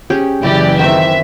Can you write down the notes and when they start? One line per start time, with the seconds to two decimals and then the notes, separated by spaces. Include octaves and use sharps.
0.10 C#4 G4 G#4
0.43 F#1 E3 E4 G4 D5 D#5
0.79 D#3 C4 E5